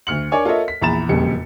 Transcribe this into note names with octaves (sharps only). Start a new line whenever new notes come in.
D2 F6 C#7 F#7
D4 A#4 C#5 D5 G#5 D6
F4 A4 A#4 C#5 D#5 E5
B6
A#1 E2 A#5 B5 A6 E7
E1 F2 A#2 C#3 G3 C#7